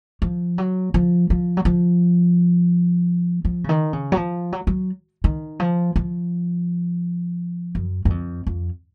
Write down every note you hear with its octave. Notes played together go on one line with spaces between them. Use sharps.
F3
F#3
F3
F3
F#3
F3
F3
C#3
D#3
C#3
F#3
F3
F#3
F#3
D#3
F3
F3
F#2
F#2
F2
F2